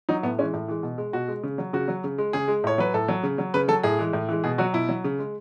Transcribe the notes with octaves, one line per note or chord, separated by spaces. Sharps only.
F#3 D#4
A2 B3
E3 G#3 C#4
A2
E3 G#3
B2
G#3
B2 F#4
G#3
C#3
F#3
C#3 F#4
F#3
C#3
G#3
C#3 G#4
G#3
A2 C#5
F#3 B4
A2 A4
F#3
C#3
F#3
C#3 B4
F#3 A4
A2 G#4
E3 G#3
A2
E3 G#3
B2 G#4
F#3 F#4
B2 E4
F#3
C#3
G#3